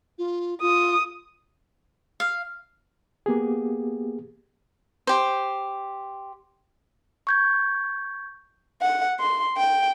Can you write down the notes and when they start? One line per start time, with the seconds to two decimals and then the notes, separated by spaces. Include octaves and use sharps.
0.18 F4
0.61 F4 D#6
2.20 F5
3.26 A#3 B3 G4 G#4
5.07 G4 C5
7.27 C#6 G6 G#6
8.82 F#5
9.20 C6
9.57 G5